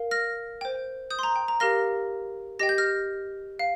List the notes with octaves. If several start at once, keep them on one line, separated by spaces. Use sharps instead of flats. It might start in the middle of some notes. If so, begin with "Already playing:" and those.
Already playing: A#4 F5
F6 A#6
C5 G5
D#6 G6
C6
A#5
G5
A#5
G4 A#4 F5 F6 A#6
G4 D#5 G5 A#6
G6
F6 A#6
F5